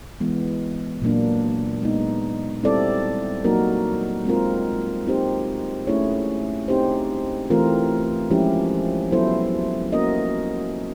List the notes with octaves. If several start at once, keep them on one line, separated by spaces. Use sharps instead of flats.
E3 G#3 B3
A#2 F#3 A#3 D4
G#3 B3 D#4
G3 C4 E4 A4 D5
F#3 A#3 D#4 F#4 A#4
G#3 C4 F4 A#4
C4 D#4 G4 C5
A3 C#4 E4 G#4 C#5
C4 D#4 G4 C5
E3 A3 C4 F4 A#4
F3 G#3 C#4 E4 G4
F#3 B3 E4 A4 C5
A#3 C#4 F#4 A#4 D#5